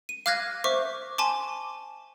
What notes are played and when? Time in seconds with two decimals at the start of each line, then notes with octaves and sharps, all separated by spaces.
0.09 D#7
0.26 F5 D6 F6 F#6 G#6 A#6
0.64 C5 E5 C#6 D6
1.18 G#5 A5 C6 D6